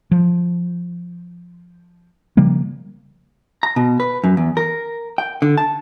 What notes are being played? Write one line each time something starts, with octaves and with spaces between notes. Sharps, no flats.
F3
C#3 F3 G3 A#3
A#5
B2
B4
F#2
E2
A#4
G5
D3
A5